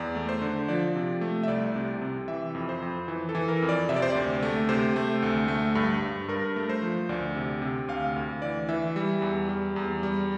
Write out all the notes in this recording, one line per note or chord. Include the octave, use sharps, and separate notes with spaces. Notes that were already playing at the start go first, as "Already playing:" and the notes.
Already playing: E2 D5
A3
C5
D3
F3 D5
C3
A3
E5
C2 D5
C3
C3
E3 E5
F2
C5
F2
E3
A4
E3
A#4
F2
D5
C3 E5
D5
C5
D5
D2
A3
C3 C5
A3
D2
A3
G2
G2
G2 A#4
A3
C5
F3
D2 D5
C3
C3
D2 F5
D2
E3 D5
E3 E5
G3
E2
G3
E2
G3